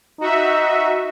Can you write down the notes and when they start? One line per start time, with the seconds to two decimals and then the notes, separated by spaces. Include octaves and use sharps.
0.21 D#4 F#4 E5